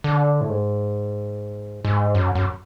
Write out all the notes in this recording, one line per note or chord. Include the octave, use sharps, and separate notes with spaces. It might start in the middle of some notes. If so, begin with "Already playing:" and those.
D3
A2
G#2
G#2
F#2
F#2